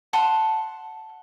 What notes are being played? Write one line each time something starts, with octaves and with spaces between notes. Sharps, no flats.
F#5 A5 C6